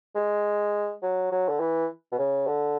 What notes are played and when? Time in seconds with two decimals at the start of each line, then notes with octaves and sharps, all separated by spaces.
0.15 G#3
1.03 F#3
1.32 F#3
1.49 D3
1.60 E3
2.12 B2
2.18 C#3
2.47 D3